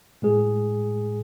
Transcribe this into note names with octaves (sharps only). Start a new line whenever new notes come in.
A2 G#3 G#4